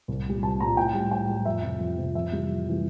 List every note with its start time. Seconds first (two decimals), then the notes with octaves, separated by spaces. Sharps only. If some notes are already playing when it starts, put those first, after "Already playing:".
0.08 C2
0.26 A#2 G3
0.43 C2 A5
0.59 A#2 G3 A#5
0.77 A2 G5
0.94 G3
1.11 A2 G5
1.29 G3
1.46 F2 E5
1.63 C3 F3
1.80 F2
1.98 C3 F3
2.15 F2 E5
2.32 C3 E3 G3
2.49 F2
2.66 C3 E3 G3